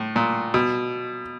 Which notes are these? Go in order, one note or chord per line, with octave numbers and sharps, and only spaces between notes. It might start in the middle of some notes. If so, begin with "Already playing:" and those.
Already playing: A2
A#2
B2